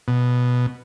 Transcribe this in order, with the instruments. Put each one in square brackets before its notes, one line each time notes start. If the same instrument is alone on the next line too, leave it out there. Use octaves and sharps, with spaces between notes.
[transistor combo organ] B2